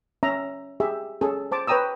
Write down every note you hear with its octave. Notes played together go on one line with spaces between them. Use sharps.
C#4 E5 A#5
G4 G#4 E5
C#4 G#4 A4
C5 A5 D6
B4 C#5 G5 A#5 D#6 E6